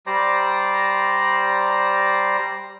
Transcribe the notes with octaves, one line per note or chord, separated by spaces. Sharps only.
G3 C5 D5 A#5